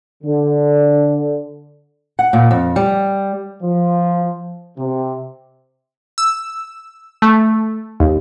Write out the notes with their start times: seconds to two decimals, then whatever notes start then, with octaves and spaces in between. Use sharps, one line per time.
0.23 D3
2.19 F#5
2.33 A#2
2.51 F2
2.76 G3
3.63 F3
4.78 C3
6.18 E6
7.22 A3
8.00 D#2